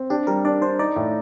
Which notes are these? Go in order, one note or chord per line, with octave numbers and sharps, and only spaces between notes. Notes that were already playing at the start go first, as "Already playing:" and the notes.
Already playing: C4
D4 G4
G3 A#4
D4 D5
D4 C5
D#4 D5
A2